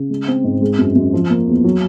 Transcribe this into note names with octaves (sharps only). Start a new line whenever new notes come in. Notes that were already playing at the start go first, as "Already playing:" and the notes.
Already playing: C#3
G#3
C4
G#2
G#3
F#2
F#2
F3
A#3
E2
F#3